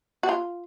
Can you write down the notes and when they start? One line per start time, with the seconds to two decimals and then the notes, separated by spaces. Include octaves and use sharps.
0.23 F#4
0.29 F4